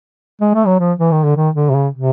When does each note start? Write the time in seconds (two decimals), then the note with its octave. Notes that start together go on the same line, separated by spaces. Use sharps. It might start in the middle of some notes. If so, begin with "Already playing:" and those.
0.41 G#3
0.54 A3
0.66 F#3
0.80 F3
0.99 E3
1.12 D#3
1.24 D3
1.36 D#3
1.55 D3
1.70 C3
1.75 C#3
1.94 C3